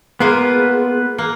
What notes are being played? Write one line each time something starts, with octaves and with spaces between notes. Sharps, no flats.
G#3 A#3 B3 F4 B4
A#3